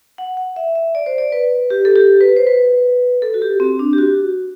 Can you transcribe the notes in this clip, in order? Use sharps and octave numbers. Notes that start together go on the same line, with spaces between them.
F#5
F#5
E5
E5
D5
C5
D5
B4
G4
A4
G4
B4
C5
B4
A4
F#4
G4
C4
D4
G4
F#4